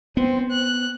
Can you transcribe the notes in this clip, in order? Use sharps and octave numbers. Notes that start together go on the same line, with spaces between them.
B3 C4
F#6